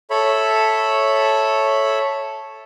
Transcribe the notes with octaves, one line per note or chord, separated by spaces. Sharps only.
A4 C#5 E5 B5